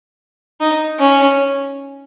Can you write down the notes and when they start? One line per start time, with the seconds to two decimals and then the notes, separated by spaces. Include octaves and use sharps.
0.61 D#4
1.00 C#4